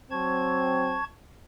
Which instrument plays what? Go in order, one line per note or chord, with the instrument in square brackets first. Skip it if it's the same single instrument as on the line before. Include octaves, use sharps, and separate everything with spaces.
[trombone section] F#3 C4 [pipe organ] A5 C#6 G#6